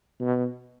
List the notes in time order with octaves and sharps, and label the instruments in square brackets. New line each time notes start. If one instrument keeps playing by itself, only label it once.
[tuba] B2